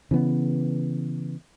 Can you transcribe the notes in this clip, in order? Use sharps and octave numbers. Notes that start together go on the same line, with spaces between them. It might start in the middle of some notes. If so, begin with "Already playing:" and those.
C#3 E3 B3